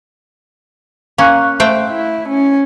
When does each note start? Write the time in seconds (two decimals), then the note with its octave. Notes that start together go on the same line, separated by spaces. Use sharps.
1.18 A#3 C#4 F5 C#6 F#6
1.60 A3 C5 G5
1.90 E4
2.29 C#4